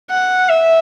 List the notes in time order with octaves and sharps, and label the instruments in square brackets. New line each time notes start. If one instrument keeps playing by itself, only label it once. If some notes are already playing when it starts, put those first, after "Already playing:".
[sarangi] F#5
E5